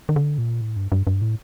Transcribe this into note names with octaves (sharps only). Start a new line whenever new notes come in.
D#3
D3
A#2
A2
G2
G2
G2
A2